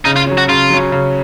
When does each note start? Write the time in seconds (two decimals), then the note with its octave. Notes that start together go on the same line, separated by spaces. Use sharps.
0.05 C#3 D#4
0.16 F4
0.27 F#3 C#4
0.38 F#4
0.49 C#3 F4
0.70 F#3 C#4
0.92 C#3